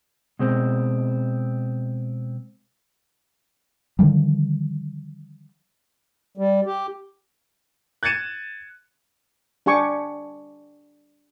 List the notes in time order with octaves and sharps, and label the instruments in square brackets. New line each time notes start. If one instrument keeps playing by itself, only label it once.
[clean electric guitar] B2 G#3 C4
[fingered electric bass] D3 D#3 F3 G3
[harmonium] G3
G4
[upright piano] F#6 G#6 A6 C#7 D#7 E7
[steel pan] D4 G4 G#5 C#6 D6